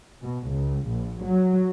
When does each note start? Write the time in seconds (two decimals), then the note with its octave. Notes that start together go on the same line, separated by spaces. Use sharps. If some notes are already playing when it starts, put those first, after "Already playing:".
0.20 B2
0.49 C#2
0.89 A#1
1.24 F#3